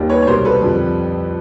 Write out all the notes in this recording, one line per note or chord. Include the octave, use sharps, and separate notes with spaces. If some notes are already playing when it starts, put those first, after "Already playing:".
Already playing: D#2 D#3 G3
B4 C#5
C#5
C2 B2 G3 A#4 C5
A4 B4
F2 D3 G3